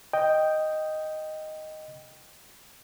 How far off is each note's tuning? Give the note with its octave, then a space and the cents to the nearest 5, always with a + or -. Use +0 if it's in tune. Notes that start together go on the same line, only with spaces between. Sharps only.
D#5 +0 G5 +0